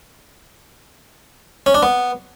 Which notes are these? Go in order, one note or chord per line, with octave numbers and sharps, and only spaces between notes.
C#4
D4
B3